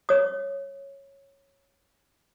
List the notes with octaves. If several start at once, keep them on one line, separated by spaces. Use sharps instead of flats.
C#5 D#6